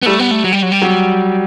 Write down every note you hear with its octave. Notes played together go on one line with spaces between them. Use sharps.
B3
G3 A3
B3
A3
F#3
G3
F#3
G3
F#3